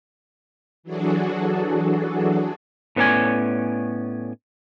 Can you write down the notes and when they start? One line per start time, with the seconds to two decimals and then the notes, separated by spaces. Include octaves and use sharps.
0.83 E3 F#3 D4 F#4 G#4 A4
2.96 A2 B3 C#4 A4 D5 G#5